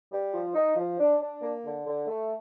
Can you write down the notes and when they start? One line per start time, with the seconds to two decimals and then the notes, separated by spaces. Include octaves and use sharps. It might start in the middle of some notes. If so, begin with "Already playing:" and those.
0.11 G3
0.33 F3
0.54 D#4
0.76 F3
0.99 D4
1.20 D4
1.42 A#3
1.64 D3
1.87 D3
2.07 A3